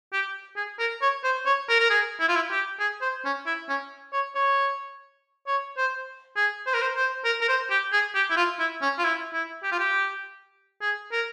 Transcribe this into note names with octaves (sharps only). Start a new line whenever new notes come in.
G4
G#4
A#4
C#5
C5
C#5
A#4
A#4
G#4
E4
F4
E4
G4
G#4
C5
C#4
E4
C#4
C#5
C#5
C#5
C5
G#4
C5
A#4
C5
C5
A#4
A#4
C5
G4
G#4
G4
E4
F4
E4
C#4
F4
E4
E4
G4
F4
G4
G#4
A#4